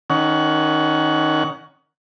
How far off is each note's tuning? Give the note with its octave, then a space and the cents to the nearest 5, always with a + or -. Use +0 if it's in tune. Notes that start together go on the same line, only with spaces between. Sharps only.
D#3 +5 C#4 +25 F#5 +0